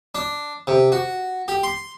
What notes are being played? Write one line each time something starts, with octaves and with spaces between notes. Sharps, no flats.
D4
C3
F#4
G4
C6